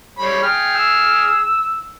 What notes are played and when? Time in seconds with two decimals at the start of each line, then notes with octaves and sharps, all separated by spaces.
0.19 G3 C#5 B5
0.43 G#4 G5 F6
0.75 E6